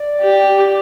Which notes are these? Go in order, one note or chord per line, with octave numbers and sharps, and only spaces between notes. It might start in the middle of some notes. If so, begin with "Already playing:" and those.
Already playing: D5
G4